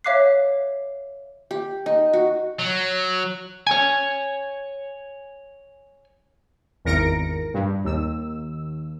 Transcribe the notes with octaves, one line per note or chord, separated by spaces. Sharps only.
C#5 E5 F5 D6 F#6 C7
G4
D#4
F#4
F#3
C#5 G#5
G#1 E2 A#4 A#6 C#7 D7
G2
D#2 E6